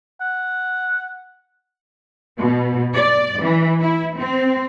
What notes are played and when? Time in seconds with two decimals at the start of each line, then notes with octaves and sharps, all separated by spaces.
0.21 F#5
2.38 B2
2.95 D5
3.42 E3
3.80 E4
4.16 C4